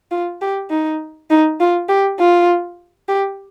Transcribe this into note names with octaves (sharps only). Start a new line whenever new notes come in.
F4
G4
D#4
D#4
F4
G4
F4
G4